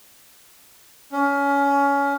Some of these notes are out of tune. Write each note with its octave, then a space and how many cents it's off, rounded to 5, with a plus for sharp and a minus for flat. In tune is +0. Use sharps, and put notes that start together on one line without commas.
C#4 +20